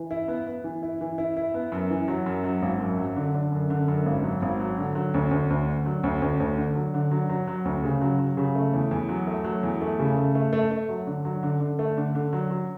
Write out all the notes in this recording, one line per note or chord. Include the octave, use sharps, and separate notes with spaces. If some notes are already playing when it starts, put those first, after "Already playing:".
Already playing: E3
E4
B3
B3
E3
E4
E3
E4
E4
B3
F#2
E3
F#3
F#2
F#3
G#1
F#2
F#3
D3
D3
F#2
D3
F#2
G#1
F#3
G#1
F#3
D3
F#3
D2
D2
D2
D3
F#3
D2
D2
D2
D3
F#3
D3
F#3
F#3
F#3
D2
C#3
F#3
F#3
C#3
A3
E2
E2
F#3
A3
F#3
E2
A3
C#3
A3
A3
A3
A3
F#3
D3
F#3
D3
D3
A3
D3
D3
F#3
F#3